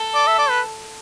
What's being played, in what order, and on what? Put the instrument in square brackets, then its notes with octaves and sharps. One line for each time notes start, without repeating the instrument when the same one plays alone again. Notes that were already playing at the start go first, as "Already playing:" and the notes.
Already playing: [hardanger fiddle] A4
[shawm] D5
E5
D5
B4